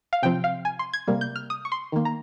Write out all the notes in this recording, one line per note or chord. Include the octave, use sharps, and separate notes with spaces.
F5
C3 F3 C4 G5
F5
G#5
C6
G#6
C3 G3 A#3
G6
F6
D#6
C#6
C6
D#3 A#3
A#5